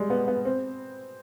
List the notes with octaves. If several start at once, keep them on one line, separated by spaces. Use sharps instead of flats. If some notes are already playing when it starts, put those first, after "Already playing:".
Already playing: G3 G#3
B3
B3
C4